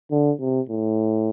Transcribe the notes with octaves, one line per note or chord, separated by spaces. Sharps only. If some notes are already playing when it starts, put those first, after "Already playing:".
D3
C3
A2